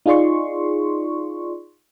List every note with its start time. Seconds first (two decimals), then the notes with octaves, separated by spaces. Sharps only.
0.06 D#4 F4 G#4 D5 C6 C#6